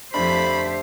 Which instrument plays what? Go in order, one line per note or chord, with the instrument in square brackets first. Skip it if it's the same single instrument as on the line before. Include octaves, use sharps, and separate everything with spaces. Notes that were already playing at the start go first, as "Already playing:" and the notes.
[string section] F2 B6 [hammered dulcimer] D3 A3 [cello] G4 C5 [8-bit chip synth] B5